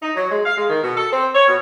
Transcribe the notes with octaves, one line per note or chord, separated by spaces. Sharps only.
D#4
F#3
G#3
F5
G#3
D#3
B2
A4
C4
C#5
B2